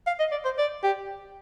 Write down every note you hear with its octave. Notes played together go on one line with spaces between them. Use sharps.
F5
D#5
D5
C5
D5
G4